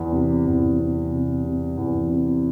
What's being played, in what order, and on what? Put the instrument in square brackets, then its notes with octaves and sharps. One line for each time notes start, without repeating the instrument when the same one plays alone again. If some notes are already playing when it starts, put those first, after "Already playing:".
Already playing: [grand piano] E2
C3
E2
C3
C3
C3
E2
C3